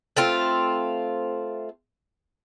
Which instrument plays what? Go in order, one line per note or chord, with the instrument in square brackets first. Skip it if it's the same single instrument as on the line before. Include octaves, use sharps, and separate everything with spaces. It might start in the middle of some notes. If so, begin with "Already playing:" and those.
[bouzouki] A3 C4 F4